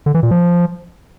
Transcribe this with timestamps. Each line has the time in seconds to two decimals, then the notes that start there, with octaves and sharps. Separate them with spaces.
0.06 D3
0.14 E3
0.23 A#2
0.31 F3